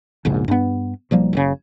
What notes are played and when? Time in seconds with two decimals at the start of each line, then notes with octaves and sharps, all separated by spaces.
0.25 E1 A#1 G#2 C#3
0.48 G2 B3
1.11 B1 F3 G3 A#3
1.33 F#1 A#2 C#3